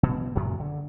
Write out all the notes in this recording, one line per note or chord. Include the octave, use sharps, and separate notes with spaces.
B2
F#2 A#2 C#3 F#3
D3